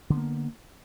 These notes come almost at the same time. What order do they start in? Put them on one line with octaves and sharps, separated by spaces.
D3 B3 A#3